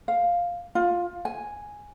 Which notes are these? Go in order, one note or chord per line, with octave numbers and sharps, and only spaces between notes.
F5
F4
G#5